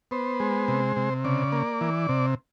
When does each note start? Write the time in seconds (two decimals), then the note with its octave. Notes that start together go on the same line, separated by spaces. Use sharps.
0.11 B3 C5
0.40 G#3
0.68 C3
0.96 C3
1.24 C#3 D5
1.52 A#3
1.81 E3
2.09 C3